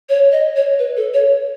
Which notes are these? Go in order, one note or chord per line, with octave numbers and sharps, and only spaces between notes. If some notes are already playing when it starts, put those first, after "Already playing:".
C#5
D#5
C#5
B4
A4
C#5